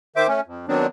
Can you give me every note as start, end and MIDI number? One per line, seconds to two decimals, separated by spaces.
0.16 0.27 51
0.16 0.27 72
0.16 0.27 76
0.16 0.27 86
0.28 0.41 57
0.28 0.41 61
0.47 0.66 41
0.68 0.86 51
0.68 0.86 54
0.68 0.86 59
0.68 0.86 60
0.68 0.86 62